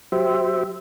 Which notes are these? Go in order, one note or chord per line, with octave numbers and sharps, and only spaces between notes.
F#3 G4 C5 E5